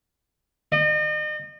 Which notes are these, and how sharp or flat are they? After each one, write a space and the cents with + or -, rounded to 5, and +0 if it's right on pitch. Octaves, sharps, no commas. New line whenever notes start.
D#5 -40